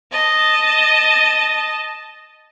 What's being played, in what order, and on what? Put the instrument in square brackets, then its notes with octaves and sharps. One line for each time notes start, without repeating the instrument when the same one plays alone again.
[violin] D#5 A5